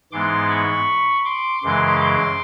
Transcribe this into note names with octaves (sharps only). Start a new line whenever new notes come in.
G#2 E3 G#3 B3 C6 D6
B5 C#6
C6 D6
F#2 C#3 E3 G#3 C6 D6
C6 D6